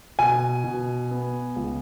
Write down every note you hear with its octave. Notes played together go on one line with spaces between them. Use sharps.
B2 G#5
B2
B3
C#2